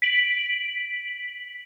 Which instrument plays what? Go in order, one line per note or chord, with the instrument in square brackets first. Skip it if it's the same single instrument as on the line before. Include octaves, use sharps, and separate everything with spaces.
[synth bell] B6 D7 F#7